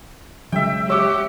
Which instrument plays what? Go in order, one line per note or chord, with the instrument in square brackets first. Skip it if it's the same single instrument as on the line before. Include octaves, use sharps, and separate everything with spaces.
[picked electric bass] C#3 F#3 G#3 [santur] E5 G5
[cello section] G4 [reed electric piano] C#5 D6 [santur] F#5 E6